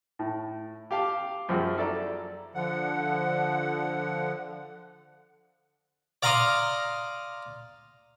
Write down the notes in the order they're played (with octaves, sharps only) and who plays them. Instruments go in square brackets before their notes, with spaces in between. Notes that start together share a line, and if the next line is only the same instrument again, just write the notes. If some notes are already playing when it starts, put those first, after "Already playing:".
[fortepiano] A2
G4 F5 A5
F#2 F3 G3 F#4 G#4
E4 A4 D5 A#5
[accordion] D3 F3 F#5
[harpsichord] D5 F5 A#5 C6 D#6